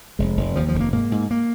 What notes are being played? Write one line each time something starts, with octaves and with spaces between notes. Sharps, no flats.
F1 G#3
F1
D#2 F3
F3
F1
A#3
G#2 A#3
G#2
A#3